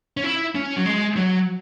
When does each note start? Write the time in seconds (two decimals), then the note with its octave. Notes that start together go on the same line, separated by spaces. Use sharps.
0.17 C#4
0.24 E4
0.55 C#4
0.76 F#3
0.86 G#3
1.16 F#3